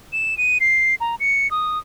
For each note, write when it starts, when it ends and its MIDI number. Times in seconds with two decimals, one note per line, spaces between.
0.13 0.37 100
0.38 0.58 99
0.60 0.95 96
1.01 1.15 82
1.20 1.50 97
1.51 1.78 87